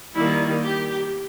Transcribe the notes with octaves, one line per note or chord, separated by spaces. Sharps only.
D#3 G3 A#3 E4
G4